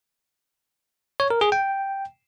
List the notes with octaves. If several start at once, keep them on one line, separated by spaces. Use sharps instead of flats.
C#5
A#4
G#4
G5